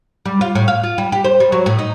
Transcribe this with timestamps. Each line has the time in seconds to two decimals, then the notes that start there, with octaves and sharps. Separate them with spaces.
0.25 G3
0.41 F4
0.55 A2
0.68 F5
0.84 F4
0.98 G3
1.12 G4
1.24 C5
1.40 G3
1.52 F#3
1.66 A2
1.79 D#4